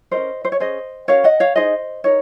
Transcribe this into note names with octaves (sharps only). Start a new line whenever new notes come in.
F4 A#4 C5 D#5
C#4
C5
C#5
C#4 G#4 C5 D#5
C#4 F#4 A#4 C#5 F5
D#5 F#5
C#5 F5
D#4 G#4 C5 D#5
D#4 A#4 C#5